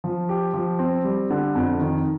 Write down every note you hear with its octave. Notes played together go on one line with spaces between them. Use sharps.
F3
G4
F3
C4
G3
D3
F2
D#3